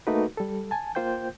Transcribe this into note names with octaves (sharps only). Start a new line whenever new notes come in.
A3 A#3 D#4 F#4 A#4 B4
G3 A4
G#5 A5
A#3 F4 C5 G5 G6